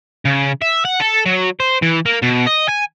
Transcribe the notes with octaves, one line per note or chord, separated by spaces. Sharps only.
C#3
E5
F#5
A4
F#3
C5
E3
A#3
B2
D#5
G#5